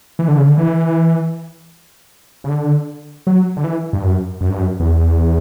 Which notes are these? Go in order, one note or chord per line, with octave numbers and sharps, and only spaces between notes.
E3
D3
C#3
D3
E3
C#3
D3
F#3
D3
E3
G2
F#2
F#2
G2
F#2
E2